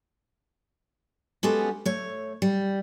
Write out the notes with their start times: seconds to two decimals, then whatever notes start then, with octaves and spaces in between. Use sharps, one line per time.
1.43 G#3 B3 C#4 F#4 G4 A4
1.85 A3 C#5
2.42 G3